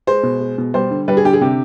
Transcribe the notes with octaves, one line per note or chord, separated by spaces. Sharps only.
G#3 C5
B2
G#3
B2
G3 C5
D3
G3 B4
G#4
D3 G4
G#4
C3 G4